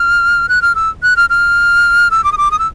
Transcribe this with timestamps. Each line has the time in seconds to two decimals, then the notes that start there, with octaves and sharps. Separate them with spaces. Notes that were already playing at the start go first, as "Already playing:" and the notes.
Already playing: F6
0.49 F#6
0.62 F6
0.75 E6
1.03 F#6
1.16 F6
1.30 F6
2.11 E6
2.24 D6
2.32 D#6
2.38 D6
2.51 D#6
2.59 E6